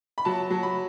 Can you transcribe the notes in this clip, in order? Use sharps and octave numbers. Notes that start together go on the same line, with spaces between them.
B5
F#3 A5
F#3
B5